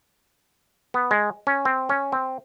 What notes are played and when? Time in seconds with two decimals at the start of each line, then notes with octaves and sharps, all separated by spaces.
0.94 B3
1.11 G#3
1.47 C#4
1.65 C4
1.89 C#4
2.12 C4